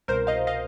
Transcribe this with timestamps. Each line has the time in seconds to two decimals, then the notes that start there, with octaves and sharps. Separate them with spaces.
0.08 C2 B2 A#4 C5
0.27 D#5 F5
0.47 D#5 F5